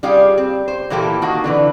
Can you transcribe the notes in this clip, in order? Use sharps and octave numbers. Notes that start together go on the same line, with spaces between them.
G3 F4 G4 G#4 F5
C4
C5
A#2 E3 A#3 E4 G4 A4
D#3 A#3 F4 F#4
D3 E3 B4